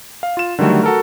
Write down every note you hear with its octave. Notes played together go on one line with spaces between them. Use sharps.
F5
F4 E7
D3 D#3 F#3 G3 A3
F#4 A4 A#4